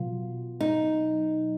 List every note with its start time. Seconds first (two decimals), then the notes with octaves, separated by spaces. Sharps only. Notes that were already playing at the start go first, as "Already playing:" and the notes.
Already playing: B2 F#3 F4
0.61 D#4